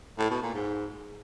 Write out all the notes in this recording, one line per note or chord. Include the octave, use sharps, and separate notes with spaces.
A2
B2
A#2
G#2